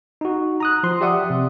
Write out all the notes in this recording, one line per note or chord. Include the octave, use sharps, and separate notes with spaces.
D#4 F#4
A#5 D#6 F#6
F3 C6
G4 D5 E5 F#5 D#6
C3